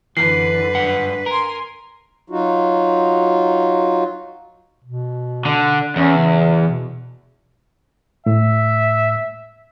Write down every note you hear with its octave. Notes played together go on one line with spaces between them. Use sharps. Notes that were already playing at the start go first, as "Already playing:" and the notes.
F#2 D3 E3 B4 C7
G2 F#5
A#4 G#5 C6
F#3 D#4 F4 F#4
B2
D3
E2 C#4
C#3
B2
A2 E5